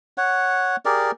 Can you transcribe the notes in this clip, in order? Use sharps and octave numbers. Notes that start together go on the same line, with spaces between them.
C#5 F#5
G4 G#4 A#4 D5